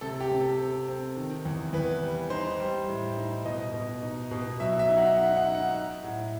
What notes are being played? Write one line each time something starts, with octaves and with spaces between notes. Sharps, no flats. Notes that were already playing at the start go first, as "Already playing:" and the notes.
C3 A4
G4
C3
A4
C4
C4
D#3
E2
E2 B4
G3
D#4 C5
G3
A2
D#4
B2 D#5
B2
D#4
B2
F#3 E5
E5
D#4
F#5
D#4 F#5
F#5
D#4
F#5
D#4
A2